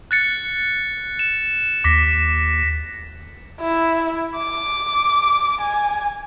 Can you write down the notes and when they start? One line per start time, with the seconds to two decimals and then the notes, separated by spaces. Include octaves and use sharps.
0.11 F#6 A6 C#7
1.19 E7
1.84 D#2 D6 A#6 B6
3.61 E4
4.38 D6
5.62 G#5